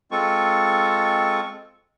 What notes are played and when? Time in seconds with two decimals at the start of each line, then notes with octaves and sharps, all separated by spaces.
0.11 G#3 C4 F4 A4 C#6